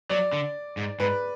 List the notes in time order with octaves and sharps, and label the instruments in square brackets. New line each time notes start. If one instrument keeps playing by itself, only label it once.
[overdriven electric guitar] F#3 [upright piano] D5
[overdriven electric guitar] D3
G#2
[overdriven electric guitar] G#2 [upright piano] B4